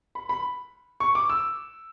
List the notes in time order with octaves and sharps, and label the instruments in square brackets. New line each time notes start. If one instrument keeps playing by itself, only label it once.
[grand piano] B5
B5
C#6
D6
E6